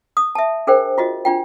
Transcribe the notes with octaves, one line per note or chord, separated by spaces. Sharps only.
D#6
E5 A5
D4 G#4 A#4 C5 G5
F4 F#4 D#5
D4 F4 G5